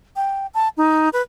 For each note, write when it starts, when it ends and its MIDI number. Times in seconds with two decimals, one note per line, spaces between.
0.16 0.47 79
0.54 0.69 81
0.77 1.09 63
1.13 1.22 71